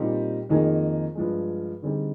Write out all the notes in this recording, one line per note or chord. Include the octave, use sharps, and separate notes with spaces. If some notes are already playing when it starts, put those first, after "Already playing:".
Already playing: A#2 G3 C4 D#4 G4
F2 D#3 A#3 D#4 G#4
G2 F3 G#3
D3 G3 C4 D#4 G#4